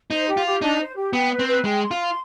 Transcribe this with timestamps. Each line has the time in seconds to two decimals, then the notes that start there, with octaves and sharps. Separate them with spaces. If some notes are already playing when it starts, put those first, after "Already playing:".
0.11 D#4 C5
0.28 G4
0.37 F4
0.45 G4
0.62 D4 D#4
0.79 C5
0.96 G4
1.13 B3 G5
1.31 B4
1.39 C4
1.47 B4
1.64 G#3 G5
1.82 C6
1.91 F4
1.99 C6